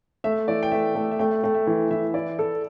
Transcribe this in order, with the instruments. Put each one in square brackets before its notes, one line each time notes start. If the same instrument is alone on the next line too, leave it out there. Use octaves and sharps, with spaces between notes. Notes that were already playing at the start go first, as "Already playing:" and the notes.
[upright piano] A3 [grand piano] E5
[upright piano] E3 [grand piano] D5
[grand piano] G5
[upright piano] A3 [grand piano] E5
[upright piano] A3
[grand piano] E5
[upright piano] A3 [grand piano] G5
[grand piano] E5
[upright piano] A3 [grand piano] G5
[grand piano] E5
[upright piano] E3
[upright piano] E3 [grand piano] E5
[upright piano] E4 [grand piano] D5
[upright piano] A4